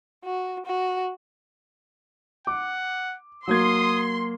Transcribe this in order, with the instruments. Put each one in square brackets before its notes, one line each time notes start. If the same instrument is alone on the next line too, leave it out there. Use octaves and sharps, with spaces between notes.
[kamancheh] F#4
F#4
[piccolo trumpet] F#5 [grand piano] D6
[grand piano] F#3 A#3 G#6 [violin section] C6 [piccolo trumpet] D#6